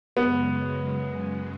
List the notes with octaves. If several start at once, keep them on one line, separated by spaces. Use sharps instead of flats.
F#2 C#3 G#3 B3